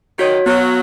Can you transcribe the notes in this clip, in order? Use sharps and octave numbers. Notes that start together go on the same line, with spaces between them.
D#3 F#4 C#5
F#3 B3